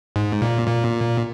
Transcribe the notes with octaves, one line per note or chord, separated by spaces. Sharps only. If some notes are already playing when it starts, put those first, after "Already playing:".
G#2
A#2
A#2